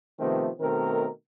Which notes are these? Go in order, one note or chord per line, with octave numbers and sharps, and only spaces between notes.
C3 D#3 F3 A3 B3 C4
B2 D#3 A3 C4 A#4